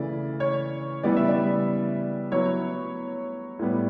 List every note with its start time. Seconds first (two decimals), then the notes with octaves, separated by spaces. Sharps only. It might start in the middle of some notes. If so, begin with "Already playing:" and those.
Already playing: C#3 E3 A3 D5
0.40 C#5
1.03 C#3 E3 G3 B3 E4 D5
1.17 E5
1.28 D5
2.31 F#3 B3 E4 C#5
3.59 A2 G3 B3